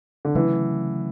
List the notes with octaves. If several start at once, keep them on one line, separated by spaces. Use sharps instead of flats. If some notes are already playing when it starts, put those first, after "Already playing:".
D3
C#3 E3 F#3 A3 C#4